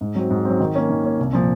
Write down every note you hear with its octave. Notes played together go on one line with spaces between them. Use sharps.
G#2
F#3 C4
G#2
F#3 C4
D#3
A#3 C#4
D#3
A#3 C#4
C2
A#2 F3